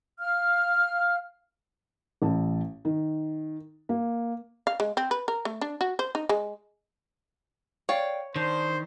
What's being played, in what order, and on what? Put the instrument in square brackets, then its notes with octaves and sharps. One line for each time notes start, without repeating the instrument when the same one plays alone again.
[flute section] F5 F6
[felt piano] A1 A5
D#3
A#3
[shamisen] F5
G#3
C4
B4
A#4
A3
D4
F#4
C5
D#4
G#3
[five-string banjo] C#5 [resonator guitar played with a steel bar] D5 F5 G5
[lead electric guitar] D#3 [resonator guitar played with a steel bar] D4 [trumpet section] C5